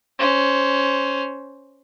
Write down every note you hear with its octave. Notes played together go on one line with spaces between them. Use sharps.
C#4 C5